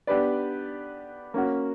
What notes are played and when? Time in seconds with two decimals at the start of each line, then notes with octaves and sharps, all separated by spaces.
0.07 B3 D4 G4 B4 D5
1.34 A#3 C#4 F#4